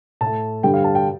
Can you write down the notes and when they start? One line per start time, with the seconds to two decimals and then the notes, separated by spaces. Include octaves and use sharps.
0.21 A2 A5
0.26 A3
0.63 G2 D3 G3 G5
0.74 F5
0.84 A5
0.95 G5